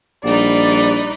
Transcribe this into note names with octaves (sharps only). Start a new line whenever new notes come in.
A#1 G3 D#4 B4 D5